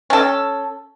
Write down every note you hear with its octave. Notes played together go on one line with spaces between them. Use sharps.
C#4 A4